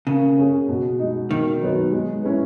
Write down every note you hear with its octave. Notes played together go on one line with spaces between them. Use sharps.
C#3 A#3
C#4 G#4
B2
G#3 D#4
B2 D#3
F#3 B3 D#4
G#3
C#4 E4 G#4 B4